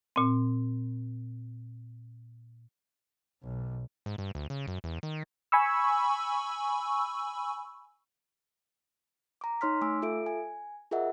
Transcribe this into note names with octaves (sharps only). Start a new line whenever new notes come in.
A#2 C4
B1
G#2
G2
D2
C#3
F#2
E2
D#3
G#5 B5 C#6 E6
A#5 D6
D#4 C#5 C6 F6 B6
A3 G#5 D6 E6
F4 A4 E5 D7
G#5
F4 G#4 A#4 D#5 E5 F#5